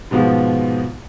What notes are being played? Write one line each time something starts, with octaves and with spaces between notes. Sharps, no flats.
G#2 B2 F3 G#3 B3